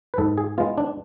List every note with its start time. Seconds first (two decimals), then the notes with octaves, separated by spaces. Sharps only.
0.14 B4
0.18 G#2 A4
0.38 G#4
0.58 G#3 B3 F4
0.78 D4